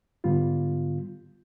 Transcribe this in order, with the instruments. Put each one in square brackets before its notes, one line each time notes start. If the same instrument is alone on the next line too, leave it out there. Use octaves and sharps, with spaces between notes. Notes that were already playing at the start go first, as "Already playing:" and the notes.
[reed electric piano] G#2 D3 G3 B3 F4